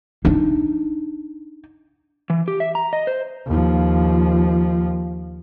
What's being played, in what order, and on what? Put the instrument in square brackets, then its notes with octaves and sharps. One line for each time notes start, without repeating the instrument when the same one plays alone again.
[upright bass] D4 D#4
[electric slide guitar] E3
G4
E5
A#5
D#5
C5
[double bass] D#2 F3